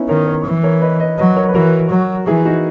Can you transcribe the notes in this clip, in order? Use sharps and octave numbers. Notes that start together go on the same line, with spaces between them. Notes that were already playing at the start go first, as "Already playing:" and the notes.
Already playing: B3 C#4 D#4 E4
D#3 A#4 C#5
A#4 C#5
E3
A#4 C#5
B4 D#5
B4 D#5
F#3 B4 D#5
A#4 C#5
B4
E3 F#4 A#4
F#3
E3 E4 G#4
D#4 F#4